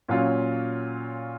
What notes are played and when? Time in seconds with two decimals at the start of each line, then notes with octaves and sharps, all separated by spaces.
0.08 A#2 F#3 C#4 F4